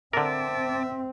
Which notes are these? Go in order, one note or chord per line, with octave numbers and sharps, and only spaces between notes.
D3 C4 A#4 E5 A5 D6